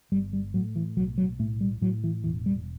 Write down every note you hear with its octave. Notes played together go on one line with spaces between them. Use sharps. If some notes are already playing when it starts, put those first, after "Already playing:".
G1 G3
G3
A2 F#3
E3
B1 F#3
F#3
A2 A3
G3
A2 F#3
E3
E1 E3
G3